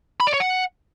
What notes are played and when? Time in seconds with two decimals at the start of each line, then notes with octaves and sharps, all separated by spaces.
0.20 B5
0.27 D5
0.34 C#5
0.40 F#5